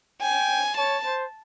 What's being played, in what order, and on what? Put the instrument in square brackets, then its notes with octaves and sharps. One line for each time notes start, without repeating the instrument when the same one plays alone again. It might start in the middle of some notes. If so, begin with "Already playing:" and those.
[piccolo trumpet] G5 [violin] G#5
[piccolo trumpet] C#5 [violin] A5
[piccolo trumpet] C5